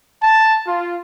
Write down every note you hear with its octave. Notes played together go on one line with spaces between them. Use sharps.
A5
F4